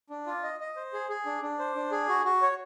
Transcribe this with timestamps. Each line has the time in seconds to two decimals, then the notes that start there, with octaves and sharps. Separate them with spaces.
0.10 D4
0.26 F4
0.43 D#5
0.60 D#5
0.76 C5
0.93 G#4
1.09 G#4
1.26 D4
1.42 D4
1.59 C5
1.75 D4
1.92 G#4
2.09 F#4
2.25 F#4
2.42 C#5